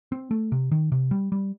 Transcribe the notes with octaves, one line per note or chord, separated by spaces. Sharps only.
C4
A3
C3
D#3
C3
G3
G3